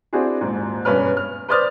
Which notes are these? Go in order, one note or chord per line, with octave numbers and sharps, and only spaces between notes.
C4 D4 E4 F#4 G#4
D#1 G#2
E1 G2 C#4 B4 F6
F6
B4 C5 D5 D#6 F6 A6